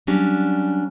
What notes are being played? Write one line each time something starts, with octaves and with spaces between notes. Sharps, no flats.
F#3 G3 C#4 D4